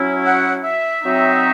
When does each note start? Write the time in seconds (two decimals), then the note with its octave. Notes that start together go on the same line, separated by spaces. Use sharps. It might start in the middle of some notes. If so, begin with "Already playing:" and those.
Already playing: F#3 C#4 E4
0.25 F#5
0.64 E5
1.03 F#3 C4 D#4